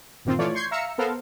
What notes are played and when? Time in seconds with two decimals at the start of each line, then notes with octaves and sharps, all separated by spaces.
0.25 G1 A#2 D#3 C4 F4
0.39 E3 A3 F4 C#5 D5
0.54 C6 C#6 G6 G#6 C7
0.71 E5 F5 A#5 E6 C#7
0.98 B3 A4 A#4 C5 F5